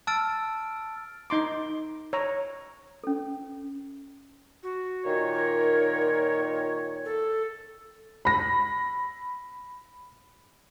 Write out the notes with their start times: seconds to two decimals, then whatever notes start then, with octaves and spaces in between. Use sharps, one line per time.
0.07 A5 E6 F6 A6 D7
1.30 D#4 C6 D6
2.13 C#5 A#5
3.04 C#4 A4
4.63 F#4
5.05 A#2 D#3 C#5
5.33 A#4
7.05 A4
8.25 B5 A#6